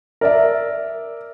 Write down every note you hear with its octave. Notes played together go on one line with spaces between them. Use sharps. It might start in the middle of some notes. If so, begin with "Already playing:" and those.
A#4 D5 E5